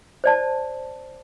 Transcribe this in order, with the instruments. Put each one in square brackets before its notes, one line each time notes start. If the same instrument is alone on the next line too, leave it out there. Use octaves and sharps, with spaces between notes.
[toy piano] C5 D5 A5